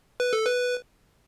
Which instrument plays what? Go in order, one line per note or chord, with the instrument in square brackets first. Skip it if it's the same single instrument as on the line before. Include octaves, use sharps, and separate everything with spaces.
[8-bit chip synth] B4
A4
B4